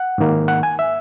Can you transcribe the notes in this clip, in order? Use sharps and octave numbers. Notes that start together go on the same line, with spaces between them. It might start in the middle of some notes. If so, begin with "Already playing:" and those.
Already playing: F#5
G#2 D#3 A#3
F#5
G#5
E5